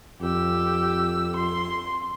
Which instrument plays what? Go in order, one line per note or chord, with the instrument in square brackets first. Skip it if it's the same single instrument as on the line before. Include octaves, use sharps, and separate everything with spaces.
[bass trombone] F2 [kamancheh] G4 E6
[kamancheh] C6